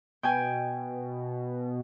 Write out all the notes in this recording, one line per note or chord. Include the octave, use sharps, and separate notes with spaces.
B2 G5 G#5